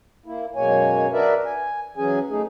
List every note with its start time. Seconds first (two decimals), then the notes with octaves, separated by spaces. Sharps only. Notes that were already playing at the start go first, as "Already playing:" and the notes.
0.26 A#3 E4
0.55 F#2 B2 G#3 A#3 C#5 G#5
1.13 D4 F#4 A#4 B4 D5 E5
1.45 G#5
1.97 E3 F#3 C#4 G#4 G#5
2.30 A3 D#4 G#4